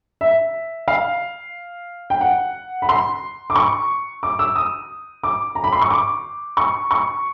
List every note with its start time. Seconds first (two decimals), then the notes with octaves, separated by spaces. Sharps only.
0.21 E5
0.88 F5
2.10 G5
2.21 F#5
2.82 B5
2.89 C6
3.50 D6
3.56 C#6
4.23 D6
4.39 E6
4.56 D#6
5.23 D6
5.55 A#5
5.64 B5
5.73 C6
5.81 C#6
5.91 D6
6.57 C#6
6.91 C#6